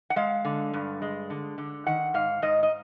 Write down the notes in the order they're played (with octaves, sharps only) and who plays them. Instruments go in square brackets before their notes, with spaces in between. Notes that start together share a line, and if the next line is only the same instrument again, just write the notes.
[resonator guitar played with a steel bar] F#5
G#3 F5
D3
G2
G#3
D3
D3
D#3 F#5
G#2 F5
G#2 D#5
D#5